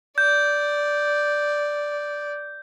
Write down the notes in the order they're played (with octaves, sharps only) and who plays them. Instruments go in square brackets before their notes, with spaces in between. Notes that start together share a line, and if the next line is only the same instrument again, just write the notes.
[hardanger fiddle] D5 [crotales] G6